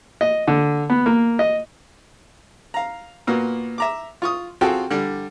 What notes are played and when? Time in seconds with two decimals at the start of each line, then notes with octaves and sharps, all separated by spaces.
0.21 D#5
0.48 D3
0.90 B3
1.06 A#3
1.39 D#5
2.74 F5 A#5
3.27 A#2 A#3 B3 F#4
3.78 E5 A#5 D6
4.22 F4 C#6 D#6
4.61 C4 F4 F#4 G#4 A4 G5
4.91 D3 G3